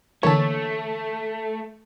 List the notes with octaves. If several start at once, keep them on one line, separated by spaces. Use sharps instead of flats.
D3 E3 A3 A#3 A4 C#5